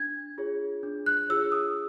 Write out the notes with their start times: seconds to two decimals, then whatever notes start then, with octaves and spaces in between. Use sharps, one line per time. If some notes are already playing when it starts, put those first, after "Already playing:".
Already playing: D4 G#6
0.38 F4 G#4 C#5
0.83 D4
1.06 F#6
1.29 F4 G#4 C#5 E6
1.52 D#6